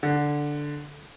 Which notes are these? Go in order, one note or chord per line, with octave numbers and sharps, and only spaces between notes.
D3